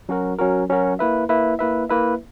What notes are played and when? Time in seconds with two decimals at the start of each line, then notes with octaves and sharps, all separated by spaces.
0.09 F#3 C#4 F#4 A#4
0.38 F#3 C#4 F#4 A#4
0.70 F#3 C#4 F#4 A#4
0.99 A#3 E4 B4 E5
1.29 A#3 E4 B4 E5
1.59 A#3 E4 B4 E5
1.89 A#3 E4 B4 E5